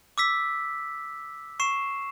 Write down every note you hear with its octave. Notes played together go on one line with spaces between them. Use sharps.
D6 E6 B6
C#6 C7 E7